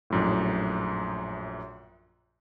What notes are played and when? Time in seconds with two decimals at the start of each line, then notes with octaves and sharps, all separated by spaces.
0.10 A#1 F#2 A2